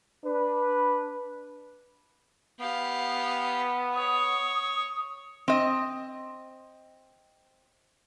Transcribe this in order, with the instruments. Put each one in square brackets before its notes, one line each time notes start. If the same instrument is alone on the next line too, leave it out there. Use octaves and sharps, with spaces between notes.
[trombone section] D4 B4
[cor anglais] B3 [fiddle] G4 F5
[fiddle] C#5 [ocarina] D#6
[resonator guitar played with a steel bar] C4 D#5